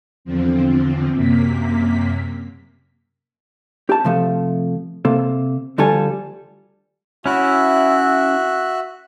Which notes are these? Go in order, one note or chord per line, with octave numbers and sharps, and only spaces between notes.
E2 D3 F3 C4
F#2 C3 A#3 B6
G4 A5
C3 F3 A3
C3 A#3 A4
D2 F3 G3 F4 A4 G#5
C#4 E4 F#4 E5 F#6